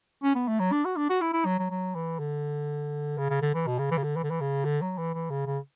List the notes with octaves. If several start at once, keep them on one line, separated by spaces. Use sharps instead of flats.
C#4
B3
A3
F#3
D4
F#4
D4
F#4
E4
E4
F#3
F#3
F#3
E3
D3
C#3
C#3
D3
E3
B2
C#3
E3
C#3
D3
E3
D3
E3
C#3
D3
F#3
E3
E3
C#3
C#3